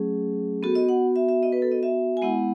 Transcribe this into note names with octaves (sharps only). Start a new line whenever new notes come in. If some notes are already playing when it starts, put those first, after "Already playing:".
Already playing: F#3 A3 C#4 G#4
B3 F#4 A4
D#5
F#5
E5
E5
D#5
B4
A4
D#5
E5
G#5
G#3 B3 E4 F#5